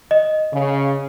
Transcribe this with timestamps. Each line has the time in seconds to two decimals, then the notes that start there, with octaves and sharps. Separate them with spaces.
0.11 D#5
0.53 C#3